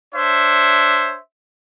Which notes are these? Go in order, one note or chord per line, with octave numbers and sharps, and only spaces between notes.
D4 C5 C#5 E5